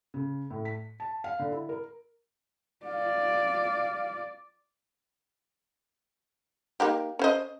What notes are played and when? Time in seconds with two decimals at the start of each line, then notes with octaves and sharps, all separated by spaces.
0.14 C#3
0.50 A2
0.65 B6
1.00 A5
1.24 F5
1.39 D3
1.52 E4
1.69 A#4
2.86 D5 F5
6.80 A#3 D#4 G4
7.19 C#4 C5 D#5